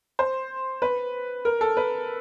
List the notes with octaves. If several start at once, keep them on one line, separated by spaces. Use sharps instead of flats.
C5
B4
A#4
A4
B4